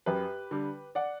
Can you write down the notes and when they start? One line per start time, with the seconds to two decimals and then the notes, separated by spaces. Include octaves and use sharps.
0.06 F#2 G4 B4
0.51 D3 G3
0.95 D5 F#5